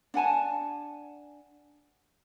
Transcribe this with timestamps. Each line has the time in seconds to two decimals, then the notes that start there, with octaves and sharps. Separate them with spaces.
0.14 D4 F#5 G#5 A5